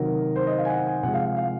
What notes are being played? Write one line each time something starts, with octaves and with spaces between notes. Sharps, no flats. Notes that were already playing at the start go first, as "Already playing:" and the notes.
Already playing: C3 D#3 F#3 A#4
C5
D#5
F5
G#5
F#5
G#5
C3 F3 G#3 F#5
F5
F5
F5